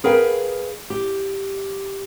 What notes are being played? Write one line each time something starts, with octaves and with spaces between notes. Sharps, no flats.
G#4 A#4 B4 F5 G5
G4